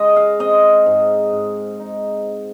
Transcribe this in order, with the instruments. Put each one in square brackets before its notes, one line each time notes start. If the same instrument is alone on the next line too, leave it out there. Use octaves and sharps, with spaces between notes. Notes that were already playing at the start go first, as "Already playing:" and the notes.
Already playing: [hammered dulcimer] C#3 G#3 C#4 D#5
F5
C4 D#5
G#2
G#2
D#4